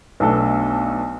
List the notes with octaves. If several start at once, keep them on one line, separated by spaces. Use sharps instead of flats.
B1 B2 A3 D4 A4